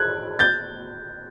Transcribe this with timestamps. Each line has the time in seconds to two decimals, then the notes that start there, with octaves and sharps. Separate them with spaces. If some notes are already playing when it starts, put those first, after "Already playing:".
Already playing: F#6 G#6
0.39 G6 A6